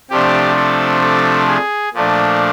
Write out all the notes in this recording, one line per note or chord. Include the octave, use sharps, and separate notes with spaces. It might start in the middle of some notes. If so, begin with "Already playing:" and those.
C3 F3 A3 D4 G4
A4
A4
G#4
A#2 F3 A3 D4